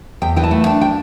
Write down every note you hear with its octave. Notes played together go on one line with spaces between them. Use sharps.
E2 G5
E3 G5
A5
A3
D4 G5
G5